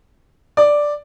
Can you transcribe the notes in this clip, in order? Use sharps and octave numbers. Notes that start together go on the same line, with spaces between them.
D5